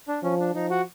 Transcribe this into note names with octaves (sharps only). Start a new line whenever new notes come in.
D4
F3 C#4
D4
F3 D#4
F#4